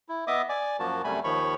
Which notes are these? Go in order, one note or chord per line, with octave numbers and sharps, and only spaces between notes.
E4
B3 D#5 E5 D6 D#6
D5 G#5 D6
F#2 F3 A#3 F#4 A5
F#2 C3 G3 A3 G#5 B5
D#2 D#3 F3 C#5 B5 C#6